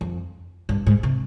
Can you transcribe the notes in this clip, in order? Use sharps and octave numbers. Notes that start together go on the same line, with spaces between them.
F2
G2
G#2
C3